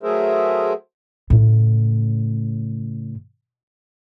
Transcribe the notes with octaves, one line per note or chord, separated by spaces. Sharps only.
F#3 A3 G#4 A#4 C5 E5
A2 C#3